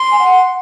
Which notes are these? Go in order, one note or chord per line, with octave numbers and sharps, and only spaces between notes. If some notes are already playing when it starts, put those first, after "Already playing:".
Already playing: C6
G#5
F#5